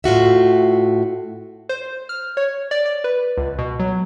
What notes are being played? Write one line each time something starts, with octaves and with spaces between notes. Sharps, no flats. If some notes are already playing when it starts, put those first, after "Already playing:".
A2 F4 F#4 E5
C5
F6
C#5
D5
D5
B4
C#2
B2
F#3